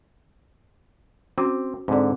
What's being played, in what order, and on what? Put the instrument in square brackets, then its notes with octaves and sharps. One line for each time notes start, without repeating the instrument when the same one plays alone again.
[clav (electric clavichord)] C4 [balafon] C#4 F#4 D6
[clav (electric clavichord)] G#2 D3 [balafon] C4 D5